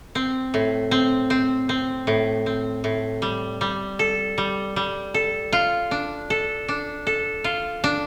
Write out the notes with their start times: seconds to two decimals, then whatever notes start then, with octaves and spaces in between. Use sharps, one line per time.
0.15 C4
0.54 A2
0.91 C4
1.30 C4
1.69 C4
2.07 A2
2.46 C4
2.84 A2
3.22 G3
3.61 G3
3.99 A4
4.38 G3
4.76 G3
5.14 A4
5.53 F4
5.91 D4
6.30 A4
6.68 D4
7.07 A4
7.44 F4
7.84 D4